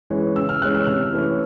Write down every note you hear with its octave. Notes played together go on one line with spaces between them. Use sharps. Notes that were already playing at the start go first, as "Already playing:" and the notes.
E3 G#3 C#4
C#3 E6
F6
E3 G#3 C#4 F#6
E6
C3 F6
E3 A3 C#4